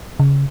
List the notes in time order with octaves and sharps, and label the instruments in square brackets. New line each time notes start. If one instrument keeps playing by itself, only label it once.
[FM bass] C#3